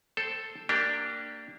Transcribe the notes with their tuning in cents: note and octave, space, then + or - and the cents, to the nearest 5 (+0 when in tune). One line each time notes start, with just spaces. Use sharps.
A4 +0 C5 +0 G5 +0
A#3 -25 D4 +0 G4 -5